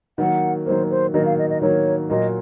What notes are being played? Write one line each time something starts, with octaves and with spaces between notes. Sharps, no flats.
D#3 F#3 A#3 F#5
D#3 F#3 A#3 C5
C5
D#3 F#3 A#3 D#5
F5
D#5
D#5
D#3 F#3 A#3 C#5
A#2 F#3 A#3 D#5